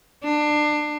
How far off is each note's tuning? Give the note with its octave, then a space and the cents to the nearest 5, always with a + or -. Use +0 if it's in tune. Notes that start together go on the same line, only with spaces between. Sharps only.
D4 +25